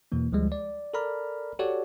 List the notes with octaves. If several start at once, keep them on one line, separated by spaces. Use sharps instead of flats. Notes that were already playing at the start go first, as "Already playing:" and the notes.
E2 B2 E3 A#3
D2 F3 G3 G#3
D5
A4 A#4 D5 A#5 B5 F6
F#4 G4 A4 C#5 D5 F#5